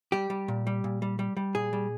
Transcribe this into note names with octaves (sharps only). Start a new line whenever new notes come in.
G3 G4
G3
A#2
G3
A#2
G3
G3
G3
A#2 G#4
G3